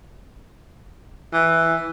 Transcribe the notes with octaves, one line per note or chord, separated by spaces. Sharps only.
E3